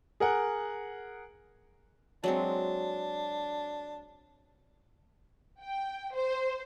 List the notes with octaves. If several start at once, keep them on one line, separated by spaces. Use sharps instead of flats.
G#4 A#4 F#5
F#3 G#3 C4 D4
G5
C5